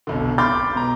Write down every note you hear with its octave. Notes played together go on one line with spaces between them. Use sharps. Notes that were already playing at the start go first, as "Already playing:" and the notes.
F1 B1 D3
B5 C6 D6 F6 G6 A6
B2 A#5